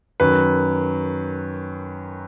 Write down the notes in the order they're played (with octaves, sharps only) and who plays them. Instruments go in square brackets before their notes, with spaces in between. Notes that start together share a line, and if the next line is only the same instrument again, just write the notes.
[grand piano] F#2 D#3 F#3 B4